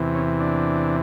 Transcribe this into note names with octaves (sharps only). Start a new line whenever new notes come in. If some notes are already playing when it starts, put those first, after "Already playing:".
Already playing: E2 C3 E3
C#4
D4